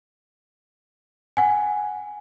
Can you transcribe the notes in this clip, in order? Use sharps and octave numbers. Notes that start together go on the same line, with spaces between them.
F#5 G#5